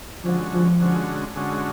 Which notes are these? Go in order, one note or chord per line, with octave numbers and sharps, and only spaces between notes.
D3 F3 G#3 C#4 F#4
F3
D3 G#3 C#4 F#4
D3 G#3 C#4 F#4